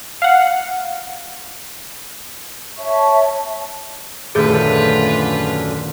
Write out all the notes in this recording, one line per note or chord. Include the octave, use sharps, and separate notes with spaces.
F5 F#5
C#5 E5 A5 C#6
D#1 F#2 D3 A3 F4 G#4 B4 G6